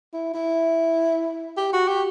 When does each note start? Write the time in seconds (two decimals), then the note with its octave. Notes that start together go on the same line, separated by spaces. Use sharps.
0.13 E4
0.34 E4
1.57 G4
1.73 F#4
1.88 G4